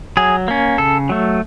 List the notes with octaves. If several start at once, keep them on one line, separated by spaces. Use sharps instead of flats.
F#3 G#4
A#3 C#4
C#3 A4
F#3 A3